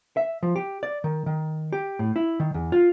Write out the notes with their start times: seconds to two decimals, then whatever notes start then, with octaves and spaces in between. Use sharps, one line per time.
0.17 E5
0.43 F3
0.56 G4
0.83 D5
1.04 D#3
1.26 D#3
1.73 G4
1.99 A2
2.16 E4
2.40 D#3
2.54 E2
2.72 F4